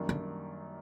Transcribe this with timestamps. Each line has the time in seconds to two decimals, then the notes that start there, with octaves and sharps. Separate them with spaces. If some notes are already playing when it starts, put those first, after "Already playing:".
Already playing: F#2 D#3 G3 A#3 D4
0.09 D3